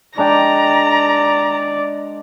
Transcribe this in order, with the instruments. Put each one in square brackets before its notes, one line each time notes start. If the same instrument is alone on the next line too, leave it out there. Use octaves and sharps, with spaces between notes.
[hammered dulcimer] G#3 D4 G5 [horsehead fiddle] D5 [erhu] A#5